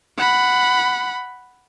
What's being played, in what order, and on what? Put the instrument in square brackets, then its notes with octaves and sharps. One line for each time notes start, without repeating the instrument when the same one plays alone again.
[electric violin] F#5 B5